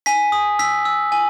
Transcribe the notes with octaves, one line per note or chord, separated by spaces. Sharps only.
G#5 B6
D#6
E6 B6
E6
G#5